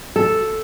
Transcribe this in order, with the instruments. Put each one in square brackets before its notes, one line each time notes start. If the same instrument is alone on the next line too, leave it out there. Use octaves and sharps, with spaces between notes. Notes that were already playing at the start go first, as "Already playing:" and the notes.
[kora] A4